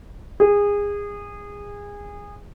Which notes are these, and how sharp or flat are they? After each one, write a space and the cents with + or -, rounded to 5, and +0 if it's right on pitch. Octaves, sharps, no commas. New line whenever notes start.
G#4 -25